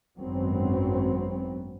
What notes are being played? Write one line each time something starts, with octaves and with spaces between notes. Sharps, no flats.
G#1 F#2 F#3 B3 C4